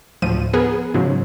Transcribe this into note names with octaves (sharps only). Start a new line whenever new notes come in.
D2 A2 F3 D#7
B3 G#4 A#4 B4
G#2 C#3 F3 F#3